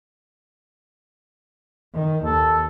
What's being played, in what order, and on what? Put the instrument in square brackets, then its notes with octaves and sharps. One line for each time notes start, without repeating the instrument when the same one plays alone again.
[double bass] D#3
[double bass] D#2 [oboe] A4